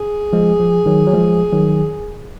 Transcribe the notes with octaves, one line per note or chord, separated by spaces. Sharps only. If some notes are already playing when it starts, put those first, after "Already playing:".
Already playing: G#4
F3 G#3
F3
D#3 F#3
F#3
F3 G#3
D#3 F#3